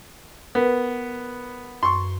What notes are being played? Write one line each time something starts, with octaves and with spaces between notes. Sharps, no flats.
B3 A#4 B4
F#2 C6 C#6